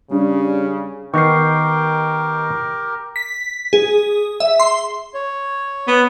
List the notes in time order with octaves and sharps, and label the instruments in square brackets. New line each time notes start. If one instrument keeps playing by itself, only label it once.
[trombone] C#3 [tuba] G3 [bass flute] C#4 [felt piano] D4
[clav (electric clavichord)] D#3 B3 D#4 [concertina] G4 A#4 [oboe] G5 [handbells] C#6 C7
[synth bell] B6
G#4
E5
C6
[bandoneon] C#5
[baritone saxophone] B3